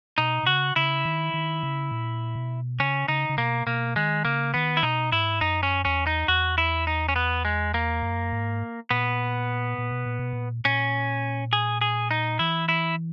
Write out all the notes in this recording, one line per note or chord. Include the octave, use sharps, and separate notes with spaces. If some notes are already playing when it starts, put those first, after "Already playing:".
B2 D#4
B2
C#3 F#4
C#3 E4
D#3
D#3
C#3
A#2
B2
C#3 C#4
C#3 D#4
C#3
B2 A#3
B2 A#3
D#3 G#3
C#3 A#3
D#3 B3
E4
B2 D#4
G#2 E4
F#2 D#4
C#4
E2 C#4
D#4
E2 F#4
E4
D#4
C#4
B3
G#3
A#3
F#2
G#2
A#2 B3
A#2
B2
A#2
B2
A#2
A#2 C#4
G#4
G#4
D#4
E3 E4
E4